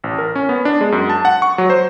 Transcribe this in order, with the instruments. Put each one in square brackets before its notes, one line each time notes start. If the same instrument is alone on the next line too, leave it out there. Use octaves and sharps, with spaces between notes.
[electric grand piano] A1
A#4
C#4
B3
D4
G#3
F#2
A5
F#5
C#6
F#3
C5